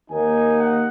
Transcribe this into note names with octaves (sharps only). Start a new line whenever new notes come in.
D#2 D#3 A#3 D#4 G#5
F#5